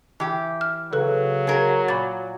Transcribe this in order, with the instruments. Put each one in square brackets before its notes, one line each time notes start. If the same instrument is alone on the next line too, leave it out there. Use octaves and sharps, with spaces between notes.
[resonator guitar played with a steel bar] E3 G4
[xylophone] F6
[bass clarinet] C#3 [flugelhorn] F#3 [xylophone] A4 B4 F#6
[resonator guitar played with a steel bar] G#4 A#4
[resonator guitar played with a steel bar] A#2 [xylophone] B5 A6